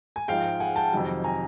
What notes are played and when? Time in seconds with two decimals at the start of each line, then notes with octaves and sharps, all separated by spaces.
0.16 G#5
0.28 G#2 F3 G#3 F5 G5
0.60 F#5 G#5
0.76 G5 A5
0.93 F2 C3 D#3 F#3
1.24 G#5 A#5